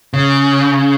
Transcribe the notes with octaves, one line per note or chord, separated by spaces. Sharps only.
C#3